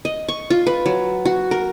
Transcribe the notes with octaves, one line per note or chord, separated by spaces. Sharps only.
D#5
C#6
F4
B4
F#3
F#4
A#4